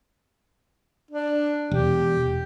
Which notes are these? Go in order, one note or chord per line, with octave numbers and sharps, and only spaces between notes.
D4
E1 G4